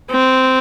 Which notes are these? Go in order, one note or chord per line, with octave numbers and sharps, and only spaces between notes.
C4